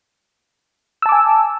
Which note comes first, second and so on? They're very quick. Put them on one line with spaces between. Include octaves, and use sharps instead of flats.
E6 A5 D6 G#5